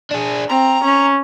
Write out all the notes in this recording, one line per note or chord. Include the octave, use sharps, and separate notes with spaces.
D4 G#4
C4 A#5
C#4